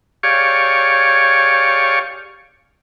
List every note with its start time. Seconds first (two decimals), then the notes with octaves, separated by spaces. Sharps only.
0.23 G4 G#4 C#5 D5 F5 C#6